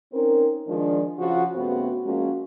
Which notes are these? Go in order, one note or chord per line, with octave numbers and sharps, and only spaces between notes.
C4 C#4 D#4 A#4
D#3 F3 G#3 D4
C#3 F3 F4 F#4
G2 C#3 A3 B3 C4 F#4
F3 G#3 A#3 C#4 F4 F#4